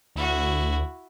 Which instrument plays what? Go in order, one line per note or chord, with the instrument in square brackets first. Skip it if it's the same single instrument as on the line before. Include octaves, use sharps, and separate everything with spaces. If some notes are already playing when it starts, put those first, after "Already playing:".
[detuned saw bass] D2 [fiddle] E4 F#4